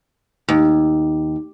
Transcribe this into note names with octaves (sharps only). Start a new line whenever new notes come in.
D#2